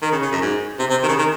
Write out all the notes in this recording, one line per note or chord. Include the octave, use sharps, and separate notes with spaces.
D#3
C#3
C#3
F#2
G#2
C3
C3
D#3
C#3
D#3